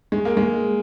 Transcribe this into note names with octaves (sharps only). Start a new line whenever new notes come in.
G#3
A#3
G#3